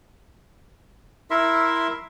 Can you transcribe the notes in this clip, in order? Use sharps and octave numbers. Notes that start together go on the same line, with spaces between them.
E4 A#4 E5 C6